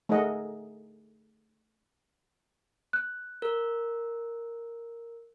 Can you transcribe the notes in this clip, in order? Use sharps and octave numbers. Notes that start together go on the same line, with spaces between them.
A3 D#4 G#4 A#4 D#5 F#5
F#6
A#4